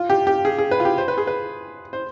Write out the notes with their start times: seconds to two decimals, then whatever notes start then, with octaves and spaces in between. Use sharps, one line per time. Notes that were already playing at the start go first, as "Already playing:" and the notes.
Already playing: F4
0.10 G4
0.27 G4
0.45 G#4
0.58 G#4
0.71 B4
0.80 F4
0.85 G4
0.98 C5
1.08 B4
1.18 G#4
1.27 B4
1.93 C5